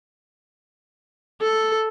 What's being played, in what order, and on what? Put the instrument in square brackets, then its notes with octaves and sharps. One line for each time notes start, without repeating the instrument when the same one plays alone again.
[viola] A4